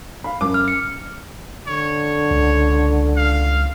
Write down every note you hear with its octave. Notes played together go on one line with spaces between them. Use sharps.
F5 B5
F#2 D6
F6
C#7
D3 C#5
C#2
F5